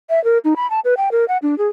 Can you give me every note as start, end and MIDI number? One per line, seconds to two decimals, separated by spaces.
0.10 0.23 76
0.24 0.38 70
0.44 0.54 63
0.56 0.69 83
0.70 0.80 81
0.85 0.94 71
0.97 1.09 79
1.12 1.25 70
1.28 1.38 78
1.42 1.57 62
1.58 1.67 68